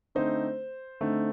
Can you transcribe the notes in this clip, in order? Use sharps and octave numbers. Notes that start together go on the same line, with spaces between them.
D3 A3 C4 D#4 C5
D3 A3 C4 D#4